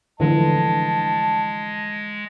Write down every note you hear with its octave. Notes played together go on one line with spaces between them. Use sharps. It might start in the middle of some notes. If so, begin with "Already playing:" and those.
D3 E3 F3 G#3 A5